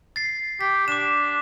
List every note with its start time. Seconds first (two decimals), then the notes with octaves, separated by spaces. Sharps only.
0.16 A6 C7
0.61 G4 B6
0.88 D4 D6 E7